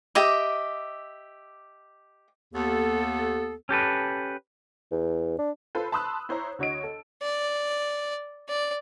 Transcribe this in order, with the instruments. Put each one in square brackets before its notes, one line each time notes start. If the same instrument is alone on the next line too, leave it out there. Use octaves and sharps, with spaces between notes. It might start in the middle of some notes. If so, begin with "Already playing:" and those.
[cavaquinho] G4 D#5 E5 D6
[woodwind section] D#2 B3 A4
[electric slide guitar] C#4 G4 A4 B4
[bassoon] E2
D4
[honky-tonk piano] F4 A4 B4 C5
A5 B5 C6 D#6 E6 F#6
E4 C5 C#5 A#5
D2 F#4 C#5 D#5 D7
A4
[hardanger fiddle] D5
D5